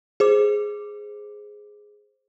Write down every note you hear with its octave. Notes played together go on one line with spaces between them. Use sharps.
G#4 C5 D6